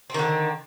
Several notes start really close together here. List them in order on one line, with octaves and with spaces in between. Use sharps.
C4 D#3 D3